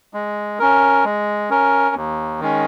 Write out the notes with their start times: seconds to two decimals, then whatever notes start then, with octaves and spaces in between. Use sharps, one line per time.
0.14 G#3
0.59 C#4 A#4
1.05 G#3
1.50 C#4 A#4
1.95 D#2
2.40 D#3 G#3 C#4